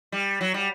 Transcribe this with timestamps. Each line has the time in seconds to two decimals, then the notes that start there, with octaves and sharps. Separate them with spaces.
0.12 G3
0.41 F#3
0.54 G3